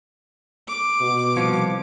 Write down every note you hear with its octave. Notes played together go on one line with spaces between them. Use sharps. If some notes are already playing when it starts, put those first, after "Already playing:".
D6
B2
C2 F3 C#5